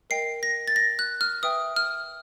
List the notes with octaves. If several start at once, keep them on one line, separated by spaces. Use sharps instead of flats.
A#4 D#5 G5 C7
A#6
A6
A#6
F#6
F6
B4 E5 G5 D#6
F6